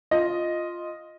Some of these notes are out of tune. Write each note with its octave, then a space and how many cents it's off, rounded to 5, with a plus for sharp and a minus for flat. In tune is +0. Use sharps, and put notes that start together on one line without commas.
F4 +0 D#5 +0